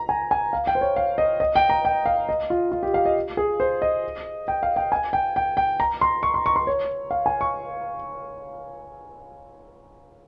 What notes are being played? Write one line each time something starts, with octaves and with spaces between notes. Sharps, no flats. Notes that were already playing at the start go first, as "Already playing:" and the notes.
Already playing: A#5
G#5
G#5
F5
G5
C5
C#5
F5
D#5
D#5
G5
A#5
G5
F5
D#5
F4
F4
G4
F5
D#5
G#4
C5
D#5
G5
F5
G5
G#5
G5
G5
G5
A#5
C6
C#6
C6
C#6
C6
C#5
F5
G#5
C#6